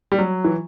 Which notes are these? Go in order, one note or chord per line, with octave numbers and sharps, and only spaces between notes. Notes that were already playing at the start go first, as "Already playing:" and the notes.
G3
F#3
E3